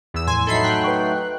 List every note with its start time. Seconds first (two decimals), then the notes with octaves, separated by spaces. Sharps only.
0.14 E2 E6
0.27 F2 A2 G#5 C6
0.47 F#3 A3 D#4 A4 B5 C7
0.64 G5 F#6
0.84 B4 C#6